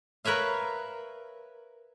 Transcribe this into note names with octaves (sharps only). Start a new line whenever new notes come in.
A#4 B4 C#5 E5 F5